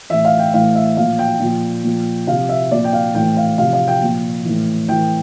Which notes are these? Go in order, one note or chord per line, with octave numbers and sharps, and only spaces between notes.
A2 E3 E5
F5
G5
A2 E3 F5
E5
A#2 F3 F5
G5
A#2 F3
A#2 F3
C3 F3 F5
E5
A#2 F3 D5
G5
F5
A2 E3 G5
F5
C3 F3 F5
F5
G5
A#2 F3
A2 E3
A2 E3 G5